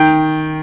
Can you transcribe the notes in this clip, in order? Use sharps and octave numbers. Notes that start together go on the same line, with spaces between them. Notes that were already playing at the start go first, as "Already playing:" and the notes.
Already playing: D#3 G5